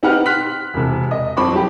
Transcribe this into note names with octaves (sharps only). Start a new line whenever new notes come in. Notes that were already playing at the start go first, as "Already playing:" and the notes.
C4 D#4 G4 B4 F#5 F6
C6 F6 F#6 B6
E1 C3
D#5
F2 C4 B5 C#6 D6
F#3 G4